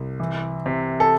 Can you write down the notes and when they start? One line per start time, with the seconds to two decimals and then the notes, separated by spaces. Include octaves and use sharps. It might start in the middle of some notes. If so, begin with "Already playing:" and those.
Already playing: C2
0.20 E3
0.66 C3
1.00 A4